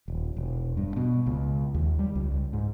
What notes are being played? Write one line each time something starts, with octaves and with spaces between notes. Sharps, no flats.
D#1
E1
G2
B2
C#2
D#2
G3
C#2
G#2